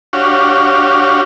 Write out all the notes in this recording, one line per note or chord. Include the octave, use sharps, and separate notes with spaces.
D4 F#4 G4 C#5 F5